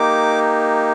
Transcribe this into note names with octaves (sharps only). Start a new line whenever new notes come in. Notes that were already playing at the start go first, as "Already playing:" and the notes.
Already playing: A#3 D#4 G4 D6